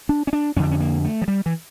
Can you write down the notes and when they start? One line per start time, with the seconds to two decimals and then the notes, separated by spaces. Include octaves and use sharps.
0.09 D4
0.27 C#4
0.33 D4
0.56 F2 C#4
0.60 D3 D4
0.71 C#4
0.80 A#3
1.05 A3
1.22 F3
1.28 G3
1.46 E3